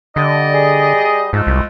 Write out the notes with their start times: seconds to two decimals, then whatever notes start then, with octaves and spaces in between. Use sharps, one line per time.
0.16 D3 G3 D5 D#5
0.54 G#4
1.33 G#2 F3 G#3 A3
1.47 C2